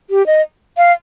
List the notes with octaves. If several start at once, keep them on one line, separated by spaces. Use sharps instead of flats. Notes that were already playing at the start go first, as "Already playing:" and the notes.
G4
D#5
F5